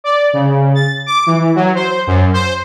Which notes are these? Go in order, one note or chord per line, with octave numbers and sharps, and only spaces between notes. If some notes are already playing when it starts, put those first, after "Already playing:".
D5
C#3
A6
D6
E3
F#3
C5
F#2
C5